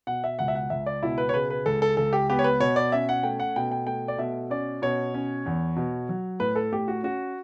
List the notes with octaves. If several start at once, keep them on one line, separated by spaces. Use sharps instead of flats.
B2 F#5
E5
C#2 F#5
E5
F#5
C#2 E5
D5
B2 E4
B4
C#5
C#3 B4
B4
C#2 A4
A4
C#2 A4
G4
B3 G4
C#5
B4
B2 C#5
D5
C#4 E5
F#5
A3 G5
F#5
B2 G5
G5
A3 G5
D5
B2 E5
C#4 D5
B2 C#5
C#4
E2
B2
F#3
A2 B4
A4
A2 G4
F#4
C#4 F#4